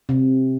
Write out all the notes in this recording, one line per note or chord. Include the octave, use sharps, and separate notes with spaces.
C3